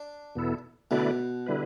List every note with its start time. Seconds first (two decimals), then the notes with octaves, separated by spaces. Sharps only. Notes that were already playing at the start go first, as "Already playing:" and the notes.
Already playing: D4
0.35 E2 B2 B3 E4 A4
0.91 B2 D3 A3 E4 B4 D5
1.46 D3 G3 E4 B4